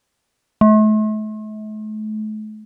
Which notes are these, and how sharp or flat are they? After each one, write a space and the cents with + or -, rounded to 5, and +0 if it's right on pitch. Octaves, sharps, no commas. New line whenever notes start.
A3 -40